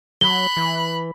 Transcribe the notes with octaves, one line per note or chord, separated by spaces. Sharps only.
F#3 B5 F#6 G7
E3